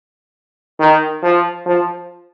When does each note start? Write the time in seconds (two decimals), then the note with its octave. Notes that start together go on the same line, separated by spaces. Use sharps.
0.79 D#3
1.23 F3
1.66 F3